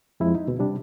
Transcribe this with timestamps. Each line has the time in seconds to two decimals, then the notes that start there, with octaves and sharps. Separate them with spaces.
0.20 F2 F3 G#3 E4
0.35 D#4
0.47 D2 B2
0.59 C3 G3 D4